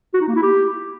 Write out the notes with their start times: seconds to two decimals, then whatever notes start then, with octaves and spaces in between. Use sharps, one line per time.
0.14 F#4
0.21 D#4
0.28 A#3
0.35 E4
0.43 G4